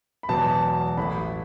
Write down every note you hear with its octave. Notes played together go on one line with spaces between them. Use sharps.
B5
E1 E2 B2 F#3 B3 A5
A1 A2 E3 B5